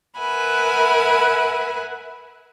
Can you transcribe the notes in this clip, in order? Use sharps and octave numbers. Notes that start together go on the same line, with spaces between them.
A#4 B4 E5 F#5 G#5 B5